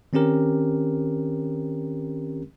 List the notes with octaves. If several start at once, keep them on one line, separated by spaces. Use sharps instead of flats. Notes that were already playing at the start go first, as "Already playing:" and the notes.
D#3 C4 C#4 G4 A#4